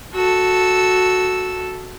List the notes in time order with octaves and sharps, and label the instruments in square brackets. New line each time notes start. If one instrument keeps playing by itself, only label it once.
[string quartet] F#4 A4 E6